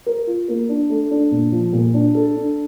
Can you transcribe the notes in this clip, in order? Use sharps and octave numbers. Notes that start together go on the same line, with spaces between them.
A#4
F4
A#3
D4
A3
D4
A#2
F3
A#2
D4
A4
D4